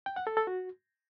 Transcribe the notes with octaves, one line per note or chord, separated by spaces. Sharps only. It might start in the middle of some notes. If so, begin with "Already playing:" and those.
G5
F#5
A4
A4
F#4